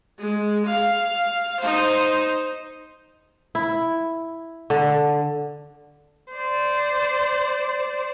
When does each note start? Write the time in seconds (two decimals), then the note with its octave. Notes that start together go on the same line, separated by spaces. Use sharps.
0.19 G#3
0.66 F5
1.60 D#4 C5
3.55 E4
4.70 D3
6.32 C5 D5